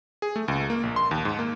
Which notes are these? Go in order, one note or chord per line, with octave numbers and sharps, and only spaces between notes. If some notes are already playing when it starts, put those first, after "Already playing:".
G#4
A3
C#2
A#3
A#1
C6
D#2
G#2
A#3